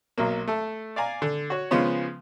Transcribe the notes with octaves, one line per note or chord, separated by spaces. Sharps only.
B1 F#3 A#3
A3 A4
D5 F5 G#5 A#5
D3
F#4 C#5
C#3 F3 G#3 B3 C#4